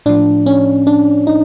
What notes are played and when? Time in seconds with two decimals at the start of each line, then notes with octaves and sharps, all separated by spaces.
0.06 A2 F3 D4
0.46 C#4
0.87 D4
1.27 D#4